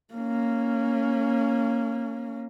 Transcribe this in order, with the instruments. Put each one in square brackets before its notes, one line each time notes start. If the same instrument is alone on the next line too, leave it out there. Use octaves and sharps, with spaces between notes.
[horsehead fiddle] A#3 C#4